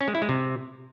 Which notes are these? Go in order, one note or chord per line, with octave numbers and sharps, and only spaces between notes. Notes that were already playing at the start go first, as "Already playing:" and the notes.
C#4
G#3
E4
G#3
C3